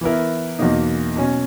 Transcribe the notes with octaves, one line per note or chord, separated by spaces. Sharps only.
E3 B3 E4 A#4
E2 B2 F#3 A#3 D#4
B2 F#3 C#4